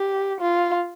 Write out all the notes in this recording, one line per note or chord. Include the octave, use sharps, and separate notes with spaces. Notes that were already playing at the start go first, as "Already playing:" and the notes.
Already playing: G4
F4